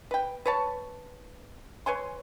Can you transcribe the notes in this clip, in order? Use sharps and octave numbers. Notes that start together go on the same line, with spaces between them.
B4 G5
B4 C#5 A5
B4 C#5 G#5 C6